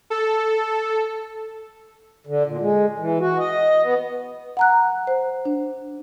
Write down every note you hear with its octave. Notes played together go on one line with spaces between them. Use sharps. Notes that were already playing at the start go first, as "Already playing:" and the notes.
A4
D3
A#2
G#3
E3
F#4
D#5
B3
F#5 A#5 F#6
C5
D4